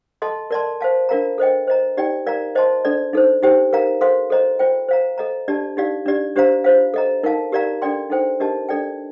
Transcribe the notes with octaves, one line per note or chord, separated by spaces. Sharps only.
A4 D#5 A5 C6
A#4 D5 A5 C6
C5 F5 A5
D4 F4 A#4 F5 A#5
A4 C5 D#5 G5
C5 D#5 A#5
D#4 G4 D5 G5
A#4 D5 F5 A#5
C5 D#5 A5 C6
D4 A4 D5
D#4 A4 C5
D#4 G4 C5 G5
A#4 F5 A#5
A4 C5 F5 C6
A4 C5 D#5 A#5
F4 C5 G5
C5 F5 A#5
A4 D#5 A#5
D4 G4 D5 A5
D#4 G4 D5 F5
D4 G4 D5
D4 G4 C5 F5 A#5
F4 C5 F5
A4 D#5 A#5
D#4 A#4 F5 A5
G4 A#4 D5 F5 A#5
D4 A4 D5 G5 C6
D#4 A4 C5 G5
D4 G4 A#4 D#5 A5
D4 A4 D5 G5